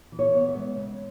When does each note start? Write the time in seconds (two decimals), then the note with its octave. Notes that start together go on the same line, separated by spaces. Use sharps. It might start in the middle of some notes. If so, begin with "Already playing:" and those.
0.12 E3
0.19 C#5
0.33 B3
0.49 E5
0.56 G#3
0.76 C#3